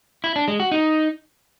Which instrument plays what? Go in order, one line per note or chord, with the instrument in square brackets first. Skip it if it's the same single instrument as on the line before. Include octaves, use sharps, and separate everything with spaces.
[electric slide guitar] E4
D4
G#3
F#4
D#4